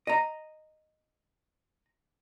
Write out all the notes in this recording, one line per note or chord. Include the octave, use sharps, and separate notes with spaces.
D#5 A#5